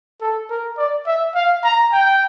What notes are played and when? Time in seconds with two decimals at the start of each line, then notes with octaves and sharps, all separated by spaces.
0.21 A4
0.50 A#4
0.78 D5
1.07 E5
1.35 F5
1.64 A#5
1.93 G5